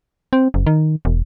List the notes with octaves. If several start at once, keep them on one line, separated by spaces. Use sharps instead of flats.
C4
F#1
D#3
E1